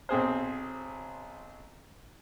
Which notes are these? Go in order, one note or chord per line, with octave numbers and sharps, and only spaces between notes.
B1 C4 G#4 C5